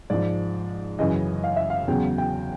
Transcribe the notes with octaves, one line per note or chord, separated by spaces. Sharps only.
G#2 F3 D5
F#2 C#3 E3 D#5
F5
E5
F5
E2 C#3 F#3 G5
G5